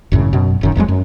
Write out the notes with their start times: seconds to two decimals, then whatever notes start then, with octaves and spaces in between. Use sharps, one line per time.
0.12 G#1 F#2 A2 C#3
0.33 F#2 B2
0.61 D1 F#2 D#3
0.75 F1 F2 F#3 G#3
0.88 F#2